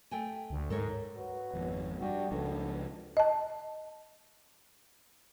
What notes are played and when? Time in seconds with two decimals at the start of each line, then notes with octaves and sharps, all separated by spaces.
0.11 A3 G5 G#5
0.50 D2
0.70 G#2 A4 A#4 C#5
1.17 F#3 F#4 B4
1.53 G#1 F2
2.01 G2 G3 D4 F#4 G4
2.31 C#2 F#2 F3 B3 D4 A4
3.17 D#5 A5